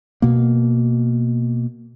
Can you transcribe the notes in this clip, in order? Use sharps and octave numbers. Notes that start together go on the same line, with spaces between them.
B2 A#3